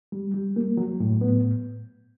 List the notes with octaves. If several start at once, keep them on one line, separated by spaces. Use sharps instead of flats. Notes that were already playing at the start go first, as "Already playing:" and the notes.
G3
G3
A#3
F#3
A2
B3